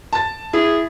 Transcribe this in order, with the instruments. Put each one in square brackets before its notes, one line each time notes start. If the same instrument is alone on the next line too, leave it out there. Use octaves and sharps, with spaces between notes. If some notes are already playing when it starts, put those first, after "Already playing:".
[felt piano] A5 A6
[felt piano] E4 [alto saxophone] G#4